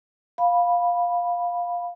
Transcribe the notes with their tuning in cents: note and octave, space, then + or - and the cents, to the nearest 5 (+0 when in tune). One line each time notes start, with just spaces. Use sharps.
F5 +10 B5 -10